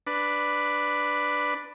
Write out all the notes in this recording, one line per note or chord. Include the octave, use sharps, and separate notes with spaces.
D4 B4